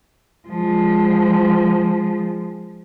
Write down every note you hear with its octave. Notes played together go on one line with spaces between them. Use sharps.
F3 G#3